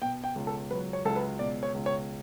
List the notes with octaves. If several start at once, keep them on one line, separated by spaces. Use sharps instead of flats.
B2 G5
G5
C#2
A4
F#3 B4
C#5
C#2 A4
B4
B2 D5
C#5
C#2
C#5